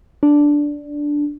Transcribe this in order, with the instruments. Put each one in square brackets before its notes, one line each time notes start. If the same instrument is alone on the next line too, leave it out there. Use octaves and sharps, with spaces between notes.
[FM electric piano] D4